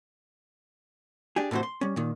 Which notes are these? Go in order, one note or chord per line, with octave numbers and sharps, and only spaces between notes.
D4 G4 G#4
A2 C3 E3 F#4 C5
C6
G3 C#4
A#2 D#3